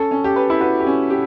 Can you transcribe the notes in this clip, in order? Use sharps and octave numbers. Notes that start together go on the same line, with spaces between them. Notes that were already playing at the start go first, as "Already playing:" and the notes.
Already playing: C#4 A4
C#4
G4
B4
E4
F#4 B4
G4
C#4
G4